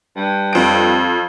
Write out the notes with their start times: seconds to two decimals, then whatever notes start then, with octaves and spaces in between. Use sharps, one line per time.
0.16 G2
0.53 F2 D7